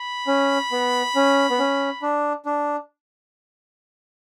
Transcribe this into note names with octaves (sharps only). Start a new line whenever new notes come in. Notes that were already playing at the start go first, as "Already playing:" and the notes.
Already playing: B5
C#4
B3
C#4
B3
C#4
D4
D4